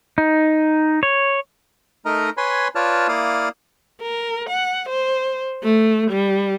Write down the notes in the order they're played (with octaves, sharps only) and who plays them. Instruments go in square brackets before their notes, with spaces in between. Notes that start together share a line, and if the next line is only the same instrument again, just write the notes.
[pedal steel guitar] D#4
C#5
[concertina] A3 D#4 A#4 D#5 A#5
B4 C#5 G#5 B5 C6
F4 B4 C#5 D5 A5 F6
A#3 E4 D5 F5 D#6 F6
[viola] A#4
F#5
C5
A3
G3